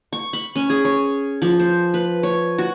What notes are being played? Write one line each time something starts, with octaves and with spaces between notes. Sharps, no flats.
C#6
B5
C#4
G#4
C#5
F3
C5
B4
C#5
F#4